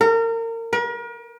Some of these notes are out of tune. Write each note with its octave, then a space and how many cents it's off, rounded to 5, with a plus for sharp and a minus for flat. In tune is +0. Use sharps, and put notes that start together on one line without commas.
A#4 -30
A#4 +40